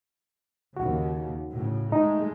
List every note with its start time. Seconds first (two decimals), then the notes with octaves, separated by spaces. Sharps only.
0.77 D#2 C#3 F#4
1.52 A2 C#3
1.92 G#3 A3 D#4